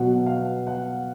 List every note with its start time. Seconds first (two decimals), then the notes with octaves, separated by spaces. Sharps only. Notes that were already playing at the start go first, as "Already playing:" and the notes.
Already playing: B2 F#3 B3 F#5
0.26 F5
0.67 F#5